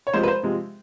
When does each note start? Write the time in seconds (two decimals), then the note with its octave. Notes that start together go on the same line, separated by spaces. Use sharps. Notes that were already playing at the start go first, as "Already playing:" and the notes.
0.07 C#5
0.14 C3 F3 G#3 C5
0.23 B4
0.28 C5
0.43 C3 F3 G#3